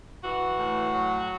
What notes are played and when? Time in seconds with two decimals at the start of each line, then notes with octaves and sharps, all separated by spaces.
0.23 E3 F#4
0.59 A2
0.94 F#3